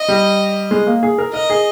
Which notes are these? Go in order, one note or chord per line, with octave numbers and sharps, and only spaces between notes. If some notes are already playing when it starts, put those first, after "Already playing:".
Already playing: D#5
G3
G#3
A#3
G#4
A#4
A#4 D#5
G#4